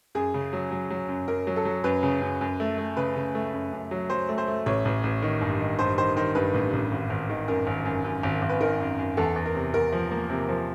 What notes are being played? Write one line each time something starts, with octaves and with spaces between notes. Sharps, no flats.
F#2 G#4
C#3
F#3
F#3
F#3
F#2
F#2 A#4
F#3
A4
F#3
F#2 B4
C#3
F#2
F#2
A3
A3
C#3 B4
C#3
A3
F#2
F#2
F#3
F#3 C5
A3
C5
A3
A1 C#5
A1
A1
D#3
G2
D#3
G2 C5
D#3 C5
D#3 C5
G2 B4
A1
A1
G#1
G#1
D#3
F#2 A#4
G#1
F#2
F#2
G#1
G#1
B4
D#3 A#4
F#2
F#2
E2 A4
E2
A#4
C3
E2 A#4
F3
A#3
C3
F3